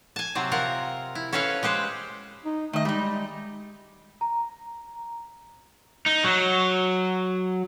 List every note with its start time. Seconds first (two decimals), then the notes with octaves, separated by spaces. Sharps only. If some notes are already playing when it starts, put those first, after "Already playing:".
0.16 G#5 A5
0.35 C3 F#3 C4
0.52 F4 A#4 F#5
1.15 E4
1.33 C#4 A4 B4 C#5 F5
1.63 G#3 G4 B4 C5
2.45 D#4
2.73 D#3 A3 D#5
2.85 G3 G#3 D#4
4.21 A#5
6.06 D#4
6.24 F#3